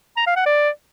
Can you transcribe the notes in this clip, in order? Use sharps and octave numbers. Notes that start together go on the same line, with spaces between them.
A#5
F5
F#5
D5